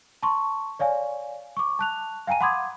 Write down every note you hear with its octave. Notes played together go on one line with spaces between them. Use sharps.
A5 C6 C#6
C#5 D5 F5 G#5
C#6 D6
A5 F#6 F7
F5 G5 G#5 A#5 D#7
F#5 B5 C6 D6 D#6 G#6